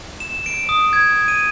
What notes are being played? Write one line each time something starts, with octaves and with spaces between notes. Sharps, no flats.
E7
D7
D#6
G#6
D#7